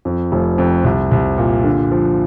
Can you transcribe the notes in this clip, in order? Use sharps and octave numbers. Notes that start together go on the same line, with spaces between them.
F2
F1
F2
C2
C2
A#2
D3
F3